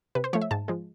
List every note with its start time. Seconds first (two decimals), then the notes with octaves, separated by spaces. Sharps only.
0.15 C3 B4
0.24 C5
0.33 F3 A3 C#5
0.42 E5
0.51 G#2 A5
0.68 F3 G#3